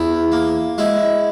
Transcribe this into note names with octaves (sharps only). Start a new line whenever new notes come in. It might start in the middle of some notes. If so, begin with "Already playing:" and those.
Already playing: E2 E4
A#3
G#3 E4